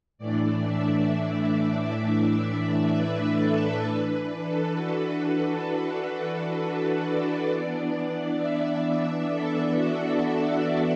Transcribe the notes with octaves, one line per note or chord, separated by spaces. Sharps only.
A2 E3 A3 D4 D5
E5
D5
B4
A4
E3 D4 B4
B4
A4
F#4
A4
B4
D5
E3 B3 D4
E5
D5
A4
F#4
F#4
F#4